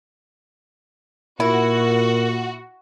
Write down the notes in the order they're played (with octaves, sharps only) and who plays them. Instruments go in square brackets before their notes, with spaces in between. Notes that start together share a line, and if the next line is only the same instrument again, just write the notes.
[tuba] A#2 [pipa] E4 [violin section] F#4 [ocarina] A#4